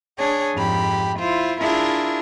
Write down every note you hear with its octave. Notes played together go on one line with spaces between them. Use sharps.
D4 G#4 C#5
F2 G#2 G4 B5
E4 F4 C5
D4 E4 F4 G#4 A#4 E5